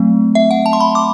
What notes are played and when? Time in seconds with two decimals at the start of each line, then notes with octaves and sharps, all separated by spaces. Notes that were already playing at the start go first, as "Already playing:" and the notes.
Already playing: F#3 A3 C4
0.35 E5
0.51 F#5
0.66 A5
0.73 C6
0.80 B5
0.95 D6